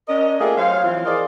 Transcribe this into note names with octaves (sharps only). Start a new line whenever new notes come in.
C#4 D4 A#4 D#5
A3 A#3 F4 G4 G#4
F#3 C5 C#5 F5
E3 F3 C4 F4
G#4 A#4 C5 D5 D#5 F5